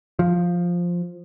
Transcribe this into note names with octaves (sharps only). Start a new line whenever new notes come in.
F3